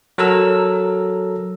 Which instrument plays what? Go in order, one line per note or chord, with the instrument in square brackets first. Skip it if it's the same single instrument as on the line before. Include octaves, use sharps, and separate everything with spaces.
[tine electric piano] F#3 A4 A#4 A#5 E6